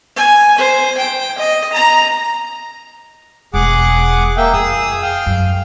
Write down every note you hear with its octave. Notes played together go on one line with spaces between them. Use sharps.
G#5
C5
G5
D#5
A#5
E1 G#4 F#5 D6
A#3 E5 G5
F2 G#4 D#6 E6
F5 G5
F#2